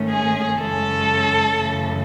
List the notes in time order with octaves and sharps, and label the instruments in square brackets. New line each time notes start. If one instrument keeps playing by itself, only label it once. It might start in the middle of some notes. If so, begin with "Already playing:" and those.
Already playing: [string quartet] G#2 D#3 A3 C#4
G#4 G#5
F#2 C#3 E3 G#3 C#4 A4 A5
F#2 C#3 E3 A3